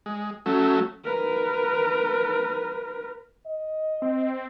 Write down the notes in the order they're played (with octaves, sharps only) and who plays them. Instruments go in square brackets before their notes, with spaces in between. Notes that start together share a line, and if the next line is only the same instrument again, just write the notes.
[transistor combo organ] G#3
[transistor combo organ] F#3 A3 [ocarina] C#4
[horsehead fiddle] A#4 B4
[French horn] D#5
[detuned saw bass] C4